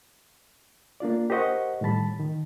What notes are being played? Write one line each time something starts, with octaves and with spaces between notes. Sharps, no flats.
A#3 D4 F4 D5
G4 A#4 C5 D#5 F#5 C#6
A2 D#3 G3 A5 B5
D#3